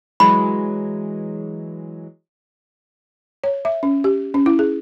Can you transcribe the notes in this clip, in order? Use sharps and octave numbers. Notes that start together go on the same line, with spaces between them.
E3 F#3 G#3 B5
C#5
E5
C#4
G4
C#4
E4
G#4